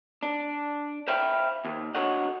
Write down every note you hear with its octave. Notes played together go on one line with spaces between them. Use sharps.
D4
C5 E5 F5 G5 B5
D#2
D4 F#4 A4 C#5 D#5 F#5